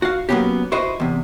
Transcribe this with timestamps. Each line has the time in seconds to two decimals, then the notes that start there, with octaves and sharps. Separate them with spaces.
0.02 F#4 F5
0.29 F#3 G#3 A#3 B3 C#4 G4
0.72 E4 F#4 B4 C5 D#5
1.00 E2 C3